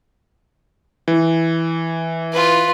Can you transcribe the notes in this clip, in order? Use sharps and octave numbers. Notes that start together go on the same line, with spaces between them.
E3
F4 B4